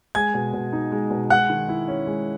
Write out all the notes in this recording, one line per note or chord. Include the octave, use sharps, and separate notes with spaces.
G#3 G#5 G#6
B2
B2
D#4
G#3
B2
G#3 F#5 F#6
D#3
E4
C#4
G#3